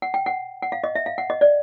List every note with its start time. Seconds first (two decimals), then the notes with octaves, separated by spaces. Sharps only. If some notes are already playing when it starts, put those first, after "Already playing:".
0.02 F#5
0.14 G5
0.26 F#5
0.62 F#5
0.72 F5
0.84 D#5
0.95 E5
1.06 F5
1.18 F#5
1.30 D#5
1.41 D5